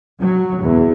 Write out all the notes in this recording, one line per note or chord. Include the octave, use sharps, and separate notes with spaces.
F#3
E2